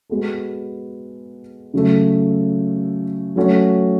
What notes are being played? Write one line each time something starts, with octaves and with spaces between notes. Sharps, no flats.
G#3 B3 F#4 A4
C#3 F#3 A3
F#3 A3 C#4 F#4